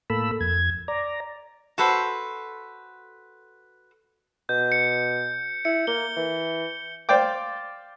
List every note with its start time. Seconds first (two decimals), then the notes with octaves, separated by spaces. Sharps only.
0.10 A2 A#3 A4 B5 E6
0.41 F2 G#6
0.88 D5 A#5
1.78 F#4 A4 B4 C5
4.49 B2 G6
4.72 C#7
5.65 E4 C#7
5.87 A#3 G7
6.17 E3
7.09 C5 D5 F5 G5 D6